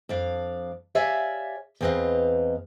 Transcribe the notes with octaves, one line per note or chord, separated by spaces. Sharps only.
F2 D4 F5
G4 C#5 D5 E5 F5 G#5
E2 B3 C4 B4 D#5 F5